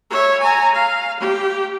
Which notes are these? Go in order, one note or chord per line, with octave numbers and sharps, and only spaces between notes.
C#5 E5
G#5 A#5
F5
G4